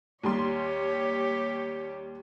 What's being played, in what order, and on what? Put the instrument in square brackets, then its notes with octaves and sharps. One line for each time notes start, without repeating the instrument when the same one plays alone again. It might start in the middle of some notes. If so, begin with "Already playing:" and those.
[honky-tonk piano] D#2 G3 C6 [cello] G4 C#5